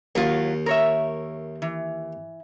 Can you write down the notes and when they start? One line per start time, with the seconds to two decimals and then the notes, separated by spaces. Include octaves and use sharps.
0.15 D#2 F#3 F4
0.66 A#4 C#5 E5
1.62 E3